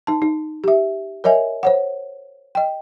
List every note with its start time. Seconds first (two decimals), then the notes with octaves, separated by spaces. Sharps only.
0.07 D#4 A5
0.22 D#4
0.64 G4 E5
1.24 A#4 C#5 D#5 E5 G#5
1.63 C5 C#5 F#5
2.55 D#5 G5